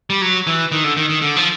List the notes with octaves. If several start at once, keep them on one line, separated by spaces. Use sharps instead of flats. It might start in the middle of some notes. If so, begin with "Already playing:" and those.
G3
F#3
E3
D#3
D3
D#3
D#3
D3
F3